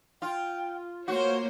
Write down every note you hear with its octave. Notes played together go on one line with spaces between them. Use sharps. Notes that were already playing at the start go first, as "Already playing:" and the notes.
F4 G5
A#3 F#4 C5 C#5 C#6